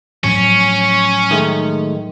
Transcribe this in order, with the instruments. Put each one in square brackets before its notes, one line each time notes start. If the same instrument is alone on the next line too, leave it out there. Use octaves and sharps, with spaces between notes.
[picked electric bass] A2 F3 F#3 [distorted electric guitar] C#4
[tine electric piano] D#3 G#3 A3